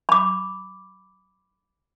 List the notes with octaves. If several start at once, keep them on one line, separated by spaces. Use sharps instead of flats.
B5 D6